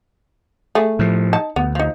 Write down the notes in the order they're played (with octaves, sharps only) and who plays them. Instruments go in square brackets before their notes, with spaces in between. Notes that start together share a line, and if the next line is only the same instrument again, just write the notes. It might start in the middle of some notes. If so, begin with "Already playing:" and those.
[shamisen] A3 G#4
[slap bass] A2 F3
[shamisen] D#4 A5
[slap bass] D2 [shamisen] B3
[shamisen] F3 D#4